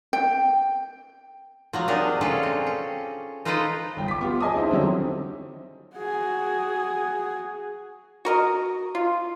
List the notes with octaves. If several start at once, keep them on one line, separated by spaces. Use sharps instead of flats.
G5
F3 F#3 A#5
C3 D4 D#4 G#4 A#4
C#4 D4 F4 G#4 A4
C4
C#4
D#4 F4 A4 B4 C5 D#5
G1 G5
D6 B6
B3 F4 G4
G#4 D#5 G#5 A5 D6 D#6
D#4 E4 C5 E5
D3 D#3 F#3 G3 C4
F#4 G#4
F#4 A#4 D#5
F4